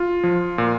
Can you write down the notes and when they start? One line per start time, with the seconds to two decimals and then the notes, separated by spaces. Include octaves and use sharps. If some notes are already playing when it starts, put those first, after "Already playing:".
Already playing: F4
0.23 F3
0.58 A#2